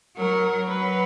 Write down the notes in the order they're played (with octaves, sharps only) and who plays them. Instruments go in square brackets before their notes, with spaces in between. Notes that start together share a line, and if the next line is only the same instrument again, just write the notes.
[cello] F#3 [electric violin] A#4
[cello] F#3 [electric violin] B4